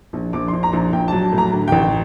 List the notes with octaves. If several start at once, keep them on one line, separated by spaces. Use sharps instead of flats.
A#1
A#1 D6
A#1 C6
A#5
A#1
A#1 G5
F#3 A5
A2
A#5
D3
A1 G5
G5